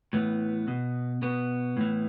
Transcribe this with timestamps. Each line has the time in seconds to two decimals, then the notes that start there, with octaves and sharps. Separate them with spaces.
0.13 A2 E3 B3
0.68 B2
1.22 B2 B3
1.77 A2 E3